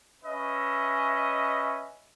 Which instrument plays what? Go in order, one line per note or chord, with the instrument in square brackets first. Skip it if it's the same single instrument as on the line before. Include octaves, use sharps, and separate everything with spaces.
[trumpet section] C#4 B4 D#5 E5